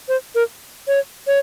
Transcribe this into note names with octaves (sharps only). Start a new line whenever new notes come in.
C5
A#4
C#5
C#5